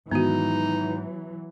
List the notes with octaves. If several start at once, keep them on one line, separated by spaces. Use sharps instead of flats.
G#2 D#3 E3 F#3 B3 D#4 F#4